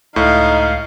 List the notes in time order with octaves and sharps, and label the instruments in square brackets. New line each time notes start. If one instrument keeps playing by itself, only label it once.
[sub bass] C#2 [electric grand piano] A2 [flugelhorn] D#4 [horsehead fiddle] F5